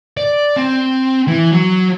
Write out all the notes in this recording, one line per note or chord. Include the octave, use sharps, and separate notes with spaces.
D5
C4
E3
F#3